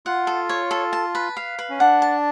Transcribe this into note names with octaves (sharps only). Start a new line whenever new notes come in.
F4 F#5
A4
C#5
A4
A5
B4
F5
B4
C#4
D4 F#5
A5